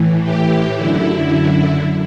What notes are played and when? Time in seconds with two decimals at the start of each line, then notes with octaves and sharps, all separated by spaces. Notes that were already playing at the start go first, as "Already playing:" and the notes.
Already playing: A2 E3
0.24 G4
0.76 F#2 D3 E4